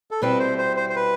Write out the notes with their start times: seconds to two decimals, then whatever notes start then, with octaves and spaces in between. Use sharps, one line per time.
0.11 A4
0.22 B2 G3 C4 E4 B4
0.40 C5
0.58 C5
0.77 C5
0.90 C5
0.96 B4